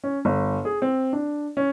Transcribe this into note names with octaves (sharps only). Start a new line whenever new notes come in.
C#4
G1
G#4
C4
D4
C#4